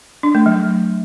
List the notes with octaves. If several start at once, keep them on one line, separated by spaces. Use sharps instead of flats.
D4
A3
F#3